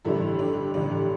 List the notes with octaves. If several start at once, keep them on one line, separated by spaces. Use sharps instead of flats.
A1 G2 D3 G3 E4 A4
D4 G4
A1 G2 D3 G3 D4